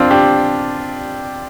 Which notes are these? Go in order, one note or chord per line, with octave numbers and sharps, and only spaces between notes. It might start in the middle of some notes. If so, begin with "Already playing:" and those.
Already playing: C4 D4 F4
D4 G4